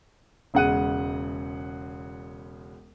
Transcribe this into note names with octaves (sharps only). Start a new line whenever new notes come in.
E1 C#3 G#3 F#5 F#6 D#7